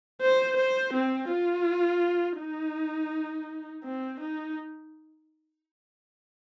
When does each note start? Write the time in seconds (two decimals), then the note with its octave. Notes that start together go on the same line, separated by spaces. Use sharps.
0.21 C5
0.57 C5
0.94 C4
1.30 F4
2.38 D#4
3.84 C4
4.21 D#4